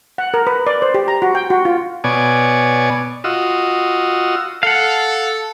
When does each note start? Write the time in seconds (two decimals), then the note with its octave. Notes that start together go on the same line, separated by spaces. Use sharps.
0.18 F#5
0.34 A#4
0.47 B4
0.67 D5
0.82 C5
0.94 G4
1.08 A#5
1.22 F#4
1.35 G5
1.50 F#4
1.65 F4
2.04 B2 C#5 D5 G#5
3.24 F4 F#4 D#5 E6
4.63 A4 F5 F#5